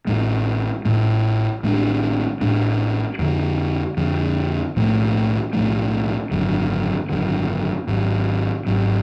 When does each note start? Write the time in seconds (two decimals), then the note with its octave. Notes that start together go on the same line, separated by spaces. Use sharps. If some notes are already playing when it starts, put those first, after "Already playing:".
0.07 A1 A2 G#3
0.85 A1 A2 G#3
1.63 A1 A2 G#3 D4
2.41 A1 A2 G#3 D4
3.19 F2 D3 F3
3.97 F2 D3 F3
4.76 B1 A2 F3 A3
5.53 B1 A2 F3 A3
6.31 G#1 F#2 D3
7.09 G#1 F#2 D3
7.87 G#1 G#2 F#3
8.66 G#1 G#2 F#3